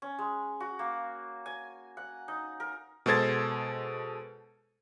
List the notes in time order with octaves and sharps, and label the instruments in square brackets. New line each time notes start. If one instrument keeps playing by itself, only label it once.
[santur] C#4
G#3
F#4
A#3
G#5
F#5
D#4
A#4
[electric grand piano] B2 G#3 A4 C5 G#6 A6